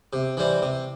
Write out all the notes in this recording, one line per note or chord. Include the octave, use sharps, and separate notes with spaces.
C3
E3 G3 C4
C3